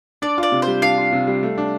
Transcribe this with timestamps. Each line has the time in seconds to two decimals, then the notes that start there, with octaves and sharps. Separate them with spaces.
0.22 D4 D5
0.38 F4
0.43 D5
0.52 C3
0.62 C5
0.67 G3
0.82 D4 F5
0.98 F4
1.13 C3
1.27 G3
1.43 A3
1.58 D4